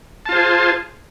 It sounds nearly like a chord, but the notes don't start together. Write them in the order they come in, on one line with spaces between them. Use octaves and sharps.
A5 F4 C5 G#4